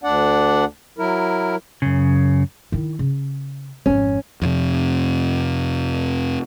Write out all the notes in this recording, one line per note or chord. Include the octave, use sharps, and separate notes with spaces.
D2 D4 D5 F#5
F#3 E4 A#4
F#2 C#3
D#3 E4
C#3
G#1 F2 C#4
F2 C3